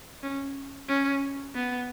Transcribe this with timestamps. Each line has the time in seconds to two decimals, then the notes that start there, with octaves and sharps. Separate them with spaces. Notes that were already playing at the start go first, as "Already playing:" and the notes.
0.23 C#4
0.89 C#4
1.55 B3